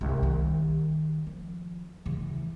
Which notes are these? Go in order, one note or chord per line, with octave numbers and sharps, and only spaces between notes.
C2
D#3
F3
C#3 E3